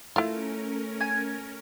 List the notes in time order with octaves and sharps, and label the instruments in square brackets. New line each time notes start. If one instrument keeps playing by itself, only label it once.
[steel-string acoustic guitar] A3 [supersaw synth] C#4 A#4 [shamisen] E4 F4
[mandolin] G#5